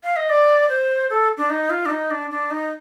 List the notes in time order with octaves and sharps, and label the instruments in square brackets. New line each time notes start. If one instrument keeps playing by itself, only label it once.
[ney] F5
D#5
D5
C5
A4
D4
D#4
F4
D4
D#4
D4
D4
D#4